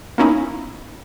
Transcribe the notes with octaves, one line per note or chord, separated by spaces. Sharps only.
A#3 B3 C#4 D#4 E4